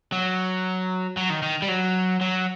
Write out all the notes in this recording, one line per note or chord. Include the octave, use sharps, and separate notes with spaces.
F#3
F#3
D#3
D#3
G3
F#3
F#3